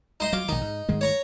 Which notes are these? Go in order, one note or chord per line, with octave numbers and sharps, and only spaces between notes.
D#4 C5 D#5
F#3 F4 D6
A#1 D#3 D#4
G#2
G#2 D#3 G#3
C#5 A#5 C#6